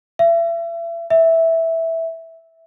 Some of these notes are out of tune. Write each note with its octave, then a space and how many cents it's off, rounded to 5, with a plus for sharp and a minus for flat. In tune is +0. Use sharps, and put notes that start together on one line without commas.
E5 +35
E5 -10